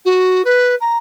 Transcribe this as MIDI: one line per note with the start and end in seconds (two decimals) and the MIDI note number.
0.05 0.42 66
0.44 0.75 71
0.80 0.97 82